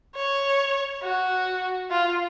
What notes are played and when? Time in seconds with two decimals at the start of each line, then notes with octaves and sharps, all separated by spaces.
0.16 C#5
1.03 F#4
1.91 F4